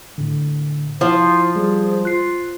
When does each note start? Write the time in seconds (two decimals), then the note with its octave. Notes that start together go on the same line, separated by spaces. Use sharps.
0.18 A2 D3
1.01 F3 E4 C5 C6
1.56 G3 G#4
2.05 F4 F#6 C7